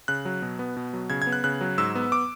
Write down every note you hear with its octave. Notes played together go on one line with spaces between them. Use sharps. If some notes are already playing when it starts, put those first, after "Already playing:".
C#3 F#6
F#3
B2
B3
B2
F#3
C#3 G#6
G#6
B3
F#6
C#3 F#6
F#3
G#2 E6
B3
D6